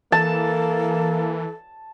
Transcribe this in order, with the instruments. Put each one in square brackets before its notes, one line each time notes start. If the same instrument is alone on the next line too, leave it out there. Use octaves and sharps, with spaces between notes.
[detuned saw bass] E3 [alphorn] A#3 [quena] A4 [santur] A5